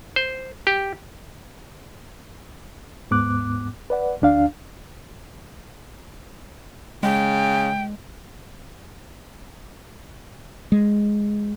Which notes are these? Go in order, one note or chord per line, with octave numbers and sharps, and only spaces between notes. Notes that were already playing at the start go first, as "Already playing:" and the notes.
C5
G4
D#2 G#2 B3 D6 F#6
B4 D5 F#5
D2 D4 F5
C#3 G#3 G5
G#3